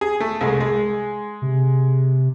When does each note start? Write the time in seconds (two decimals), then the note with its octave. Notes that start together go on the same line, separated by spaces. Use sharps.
0.01 G#4
0.20 A3
0.41 C2 G#3
0.60 G#3
1.42 C3